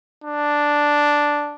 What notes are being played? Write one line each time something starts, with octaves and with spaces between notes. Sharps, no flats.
D4